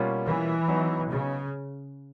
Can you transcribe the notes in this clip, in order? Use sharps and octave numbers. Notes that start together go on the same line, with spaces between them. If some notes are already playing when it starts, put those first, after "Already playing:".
Already playing: B2 G3 A#3 C#4 F4
E3
F#3 B3 D#4 F#4
C#3